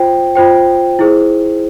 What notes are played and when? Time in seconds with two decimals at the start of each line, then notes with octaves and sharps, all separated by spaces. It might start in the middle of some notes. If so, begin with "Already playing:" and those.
Already playing: F4 C5 G5
0.35 F4 C5 G5
0.99 E4 G#4 C5